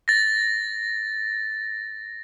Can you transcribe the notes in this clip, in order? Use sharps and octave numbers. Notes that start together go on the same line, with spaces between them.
A6 A#6